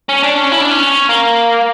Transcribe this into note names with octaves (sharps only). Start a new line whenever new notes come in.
C#4
D4
C#4
E4
D4
C#4
A#3